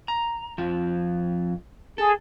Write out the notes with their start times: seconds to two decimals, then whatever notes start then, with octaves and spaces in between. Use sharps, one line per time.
0.08 A#5
0.58 F2 F3
1.98 G#4 A4